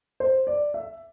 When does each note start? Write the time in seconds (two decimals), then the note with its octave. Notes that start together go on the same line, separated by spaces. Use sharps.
0.20 C5
0.47 D5
0.74 E5